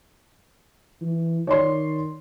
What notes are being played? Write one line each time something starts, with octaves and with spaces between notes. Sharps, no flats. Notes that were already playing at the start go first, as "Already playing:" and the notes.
E3
D#3 C#5 D5 C6